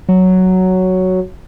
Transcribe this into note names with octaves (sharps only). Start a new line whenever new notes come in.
F#3